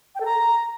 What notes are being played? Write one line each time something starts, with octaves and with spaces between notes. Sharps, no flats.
G5
A4
A#5